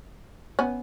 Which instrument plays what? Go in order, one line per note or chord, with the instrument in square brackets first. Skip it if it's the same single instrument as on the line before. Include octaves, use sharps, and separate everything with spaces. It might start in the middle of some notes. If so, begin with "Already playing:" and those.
[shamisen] B3 C#4